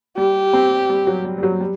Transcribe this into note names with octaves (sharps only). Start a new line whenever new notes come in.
G3 G4
C4
G3
F#3
G3
G3
F#3
G3